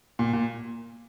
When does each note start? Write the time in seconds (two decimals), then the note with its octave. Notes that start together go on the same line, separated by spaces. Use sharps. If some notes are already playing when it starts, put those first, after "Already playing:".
0.19 A#2
0.33 A#2